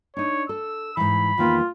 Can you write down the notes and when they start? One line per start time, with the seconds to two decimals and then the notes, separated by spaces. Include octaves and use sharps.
0.17 D4 D#4 C#5
0.49 A4 E6
0.97 G#2 E3 B5
1.38 E2 D#3 A#3 F4